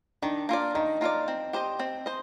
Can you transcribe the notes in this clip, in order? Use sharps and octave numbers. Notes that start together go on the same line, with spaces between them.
D#3 D4
A#3 F4 A#4 D5
D#3 D#4
A#3 F4 A#4 D5
C4
G4 C5 D#5
C4
C5 D#5